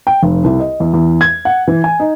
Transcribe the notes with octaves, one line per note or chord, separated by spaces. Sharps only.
G5
F1
C2
D#5
E2
E2
G#6
F#5
E3
G#5
D#4